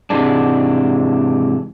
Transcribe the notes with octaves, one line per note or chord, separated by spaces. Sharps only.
G#2 C3 E3 G#3 D4